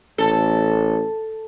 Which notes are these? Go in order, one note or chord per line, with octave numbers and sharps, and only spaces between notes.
A1 A4